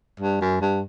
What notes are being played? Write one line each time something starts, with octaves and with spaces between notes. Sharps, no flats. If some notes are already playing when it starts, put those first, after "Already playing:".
G2
F#2
G2